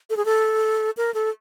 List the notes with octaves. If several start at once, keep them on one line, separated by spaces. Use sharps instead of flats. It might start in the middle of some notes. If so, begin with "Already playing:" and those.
A4
G#4
A4
A#4
A4